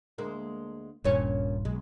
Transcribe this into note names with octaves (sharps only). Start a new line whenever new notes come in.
D2 G#3 A#3
D#1 G2 A#2 C#4
B1 G#3